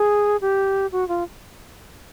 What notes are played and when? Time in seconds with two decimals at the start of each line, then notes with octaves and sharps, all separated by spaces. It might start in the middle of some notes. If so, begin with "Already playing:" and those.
Already playing: G#4
0.41 G4
0.92 F#4
1.08 F4